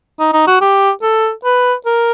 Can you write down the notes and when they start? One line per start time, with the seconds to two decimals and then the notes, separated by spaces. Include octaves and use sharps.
0.19 D#4
0.33 D#4
0.47 F#4
0.61 G4
1.02 A4
1.44 B4
1.86 A#4